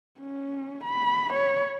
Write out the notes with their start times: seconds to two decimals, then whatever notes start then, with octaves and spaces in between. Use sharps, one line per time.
0.20 C#4
0.84 B5
1.33 C#5